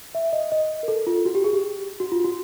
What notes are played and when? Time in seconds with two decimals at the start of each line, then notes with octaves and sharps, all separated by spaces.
0.15 E5
0.33 D#5
0.52 D#5
0.83 A#4
0.88 A4
1.07 F4
1.25 F#4
1.35 G4
1.44 G#4
1.53 G4
2.00 F#4
2.12 F4
2.24 F#4